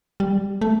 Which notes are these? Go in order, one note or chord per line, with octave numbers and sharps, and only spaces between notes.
G3
A3